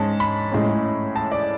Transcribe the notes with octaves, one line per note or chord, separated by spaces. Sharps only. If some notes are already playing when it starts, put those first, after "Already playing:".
Already playing: G#2 G#3 C#4 A5
B5
A2 G#3 C#4
A5
D5